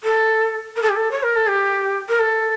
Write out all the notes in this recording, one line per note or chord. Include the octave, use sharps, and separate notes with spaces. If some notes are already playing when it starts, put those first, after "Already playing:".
A4
A#4
A4
G4
A4
C#5
A#4
A4
G4
A#4
A4